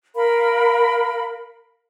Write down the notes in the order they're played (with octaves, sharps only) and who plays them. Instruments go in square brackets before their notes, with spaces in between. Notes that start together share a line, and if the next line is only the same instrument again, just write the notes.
[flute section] A#4 F5 B5